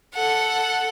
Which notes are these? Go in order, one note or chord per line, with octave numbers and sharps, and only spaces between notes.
A4 F#5